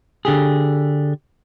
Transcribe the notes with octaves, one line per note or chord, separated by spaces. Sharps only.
D3 G4 G#4